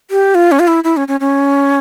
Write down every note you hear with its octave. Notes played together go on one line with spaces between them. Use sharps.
G4
F4
C#4
F4
E4
E4
C#4
C#4
C#4